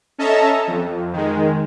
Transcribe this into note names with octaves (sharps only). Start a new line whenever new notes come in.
C#4 A4 D#5 E5 A5 A#5
F2
D#3 G#3